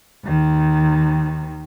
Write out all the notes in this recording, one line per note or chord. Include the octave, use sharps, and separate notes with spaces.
D#2 D#3